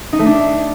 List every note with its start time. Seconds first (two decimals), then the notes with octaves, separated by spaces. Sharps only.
0.13 D#4
0.19 A3
0.25 D4